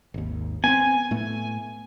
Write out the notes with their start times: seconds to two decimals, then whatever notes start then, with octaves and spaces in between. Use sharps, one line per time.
0.14 G#1 D#2
0.64 B3 C4 G#5
1.11 A2 A3 B3